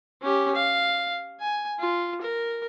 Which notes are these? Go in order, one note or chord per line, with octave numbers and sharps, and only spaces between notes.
C#4 G4
F5
G#5
F4
A#4